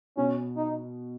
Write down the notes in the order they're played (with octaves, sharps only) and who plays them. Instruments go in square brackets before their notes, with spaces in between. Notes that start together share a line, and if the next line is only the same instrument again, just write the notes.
[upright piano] B2 [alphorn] C#4
[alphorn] D#4